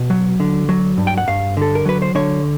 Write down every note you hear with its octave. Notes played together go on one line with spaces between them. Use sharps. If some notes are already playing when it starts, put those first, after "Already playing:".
Already playing: B2
F#3
D3
F#3
G2
G5
F#5
G2 F5
D3 A4
A#4
F#3 B4
C5
D3 C#5